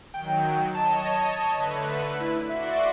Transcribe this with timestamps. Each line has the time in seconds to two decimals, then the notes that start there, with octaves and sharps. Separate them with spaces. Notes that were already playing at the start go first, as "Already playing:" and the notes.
0.14 D#3 F#3 G5
0.74 C#5 D#5 A5
1.53 D3 A3 B4
2.20 E4
2.49 F#4 D5 E5 C6